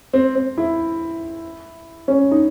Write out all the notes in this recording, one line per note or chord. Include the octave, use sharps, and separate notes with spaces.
C4
C4
E4
C#4
D#4